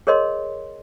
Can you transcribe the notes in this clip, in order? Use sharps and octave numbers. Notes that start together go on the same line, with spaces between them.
G#4 A#4 C#5 D#5 C6